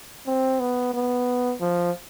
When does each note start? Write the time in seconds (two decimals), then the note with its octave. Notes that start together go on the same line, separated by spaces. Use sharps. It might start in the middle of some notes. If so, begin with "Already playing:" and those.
0.27 C4
0.60 B3
0.94 B3
1.61 F3